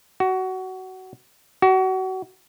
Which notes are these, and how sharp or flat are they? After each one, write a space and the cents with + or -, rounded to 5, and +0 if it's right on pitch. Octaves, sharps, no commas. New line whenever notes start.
F#4 +20
F#4 +30